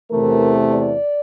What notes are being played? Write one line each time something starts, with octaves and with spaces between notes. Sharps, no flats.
E2 C3 E3 A3 A#4
D5